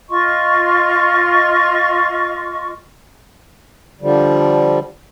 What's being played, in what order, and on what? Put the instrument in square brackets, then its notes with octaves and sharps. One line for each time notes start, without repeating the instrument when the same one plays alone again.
[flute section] F4 D#5 C6 C#6
[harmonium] D3 F3 G3